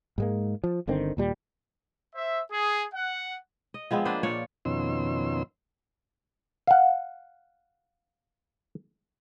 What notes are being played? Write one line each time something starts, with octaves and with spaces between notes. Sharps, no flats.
G#2 G#3 A#3
F3
G1 D3 D#3 C4
D#2 A#2 G3
C5 E5
G#4
F#5
D#5
F3 G#3 B3 C4
A#3 D4 B4 C5
A#2 C#5 D5
F2 B2 D#3 C#4 C6 E6
F5 F#5